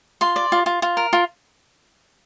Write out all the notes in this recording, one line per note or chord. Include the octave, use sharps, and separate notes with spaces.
F4 C6
D5
F4
F4
F4
A#4
F4